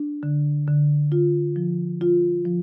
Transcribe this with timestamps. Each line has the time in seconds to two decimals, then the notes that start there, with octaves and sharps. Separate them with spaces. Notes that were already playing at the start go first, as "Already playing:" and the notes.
Already playing: D4
0.23 D3
0.67 D3
1.12 F4
1.56 F3
2.01 F4
2.45 F3